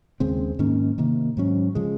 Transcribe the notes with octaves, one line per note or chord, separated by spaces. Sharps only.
D#2 C#3 G#3 C4
G#2 D#3 A#3 C#4
C3 D#3 A#3
G#2 F#3 C#4
C#3 F3 G#3